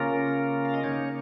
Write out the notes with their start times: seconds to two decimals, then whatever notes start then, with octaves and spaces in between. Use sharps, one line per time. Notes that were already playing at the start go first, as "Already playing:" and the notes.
Already playing: C#3 A#3 C#4 F4 A#4
0.65 F5
0.74 D#5
0.84 C#3 A#3 C#4 D#4 C#5